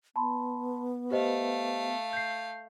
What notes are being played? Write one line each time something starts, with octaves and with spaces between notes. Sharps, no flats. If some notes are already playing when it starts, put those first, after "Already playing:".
B3 A5 B5 C6
A3 G4 C5 D#5 F5
G6 C7